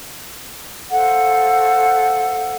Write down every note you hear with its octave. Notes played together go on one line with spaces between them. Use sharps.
A4 C5 F5 F#5